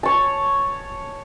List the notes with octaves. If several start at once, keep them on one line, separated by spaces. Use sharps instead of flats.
C#5 A5